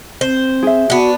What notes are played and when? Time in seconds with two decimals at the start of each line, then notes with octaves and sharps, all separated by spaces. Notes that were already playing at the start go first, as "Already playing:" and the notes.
0.21 C4 C5
0.63 G#4 E5
0.90 B3 D4 F#4